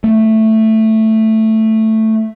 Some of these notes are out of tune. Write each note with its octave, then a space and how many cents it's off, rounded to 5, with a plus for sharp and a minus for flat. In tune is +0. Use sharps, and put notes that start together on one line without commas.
A3 +5